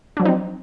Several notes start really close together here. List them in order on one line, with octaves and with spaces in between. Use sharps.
D4 F#3 F3 D#4 C4